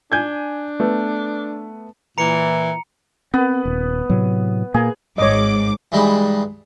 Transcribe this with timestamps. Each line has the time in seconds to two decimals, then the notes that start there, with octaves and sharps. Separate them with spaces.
0.12 D4 G#5 G6 G#6
0.80 A3 B3
2.18 A#2 E3 A#5 C#7
3.34 B3 C4
3.65 D#1
4.10 A2 C3 F#3
4.74 A#2 A#3 G#4
5.18 G#1 G#2 C#5 D#5 D6
5.92 G2 E3 G3 G#3 D#4 E4